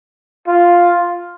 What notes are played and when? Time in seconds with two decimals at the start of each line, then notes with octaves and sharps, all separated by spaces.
0.47 F4